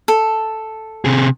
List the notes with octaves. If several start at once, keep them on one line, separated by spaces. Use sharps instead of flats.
A4
C3 G#4